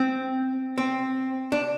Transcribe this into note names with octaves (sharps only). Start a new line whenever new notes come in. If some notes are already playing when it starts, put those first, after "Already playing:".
Already playing: C4
C4
D4